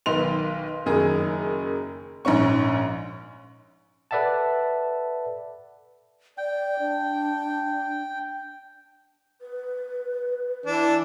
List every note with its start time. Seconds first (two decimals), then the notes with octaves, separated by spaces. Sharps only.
0.06 B1 D#3 B4 C6 F7
0.86 F#1 F#2 D#3 G#4
2.25 A#1 G#2 C#4 C#6
4.11 A4 B4 D5 E5 F#5 A5
6.38 D5 G5
6.80 D4
9.41 B4
10.66 E3 D4